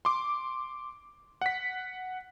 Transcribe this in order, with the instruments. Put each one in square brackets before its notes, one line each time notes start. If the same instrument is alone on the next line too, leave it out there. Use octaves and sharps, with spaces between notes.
[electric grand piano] C6 D6
F#5 B6